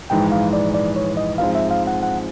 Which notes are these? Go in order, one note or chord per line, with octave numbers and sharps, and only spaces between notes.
A#1 G#2 E3 G#3 G5
F5
D5
D5
C#5
D#5
G#2 F3 G#3 C4 F5
E5
F5
F#5
F#5